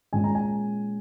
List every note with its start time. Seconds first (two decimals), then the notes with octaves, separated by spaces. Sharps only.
0.13 A#2 G#3 C#4 G#5
0.24 A#5
0.35 G#5